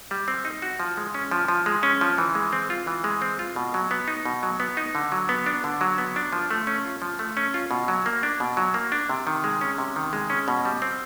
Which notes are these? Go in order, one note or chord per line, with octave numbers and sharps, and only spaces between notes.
G3
C4
D#4
F#4
F3
G#3
C#4
F3
F3
G#3
C#4
F3
E3
G#3
C4
F4
E3
G#3
C4
F4
B2
F#3
B3
D#4
B2
F#3
B3
D#4
D3
F#3
B3
D4
D3
F#3
B3
D4
F3
A3
C#4
F4
F3
A3
C#4
F4
B2
F#3
A#3
D4
B2
F#3
A#3
D4
C3
D#3
G#3
C#4
C3
D#3
G#3
C#4
B2
G3
C4